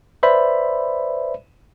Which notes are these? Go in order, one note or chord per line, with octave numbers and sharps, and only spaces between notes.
B4 C5 D5 E5 B5